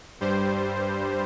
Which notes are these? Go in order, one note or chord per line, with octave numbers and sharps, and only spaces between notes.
G2 G3 C5